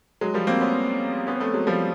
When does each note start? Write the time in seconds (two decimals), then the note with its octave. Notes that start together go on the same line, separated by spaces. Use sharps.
0.21 F#3 G#3
0.34 F3 G3
0.47 A#3 C4
0.61 B3 C#4
1.27 B3 C#4
1.35 C4
1.40 A3 B3
1.54 F#3 G#3
1.67 F3 G3